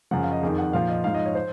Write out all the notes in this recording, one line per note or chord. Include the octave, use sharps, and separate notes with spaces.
F#2 C#3 F3 F#5
F5
D#5
F2 D#3 G#4
F#5
A#2 F3 F5
D#5
G#2 F3 F5
D#5
C#5
C5